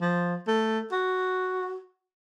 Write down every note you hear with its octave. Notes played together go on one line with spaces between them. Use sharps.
F3
A3
F#4